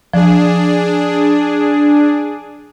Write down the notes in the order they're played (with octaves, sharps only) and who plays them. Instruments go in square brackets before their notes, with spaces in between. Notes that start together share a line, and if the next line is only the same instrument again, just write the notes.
[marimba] F3 [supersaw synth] D4 G#4